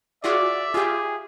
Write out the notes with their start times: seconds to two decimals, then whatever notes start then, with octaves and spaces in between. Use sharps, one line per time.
0.24 F4 F#4 G#4 D5 E5 D6
0.74 F4 G4 G#4